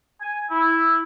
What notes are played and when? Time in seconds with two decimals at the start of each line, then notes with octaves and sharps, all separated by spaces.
0.21 G#5
0.50 E4